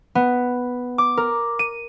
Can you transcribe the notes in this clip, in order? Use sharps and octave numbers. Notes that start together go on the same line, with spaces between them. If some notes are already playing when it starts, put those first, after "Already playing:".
B3
D6
A#4
D#7